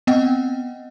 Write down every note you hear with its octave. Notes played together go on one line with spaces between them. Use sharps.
B3 C4 D#5 F#5 G5